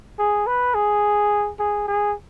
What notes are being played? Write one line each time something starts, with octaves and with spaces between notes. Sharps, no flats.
G#4
B4
G#4
G#4
G#4